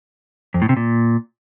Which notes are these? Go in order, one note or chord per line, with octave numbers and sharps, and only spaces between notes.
F2
A2
C3
A#2